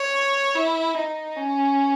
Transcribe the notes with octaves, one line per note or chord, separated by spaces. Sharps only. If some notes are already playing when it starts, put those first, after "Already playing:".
Already playing: C#5
E4
D#4
C#4